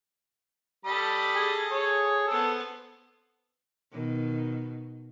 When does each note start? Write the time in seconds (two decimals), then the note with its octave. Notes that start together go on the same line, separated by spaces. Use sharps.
0.85 G3 A4 D#5 B5
1.36 G#4
1.71 G#4 C#5
2.28 B3 A4 C5
3.91 B2 D#3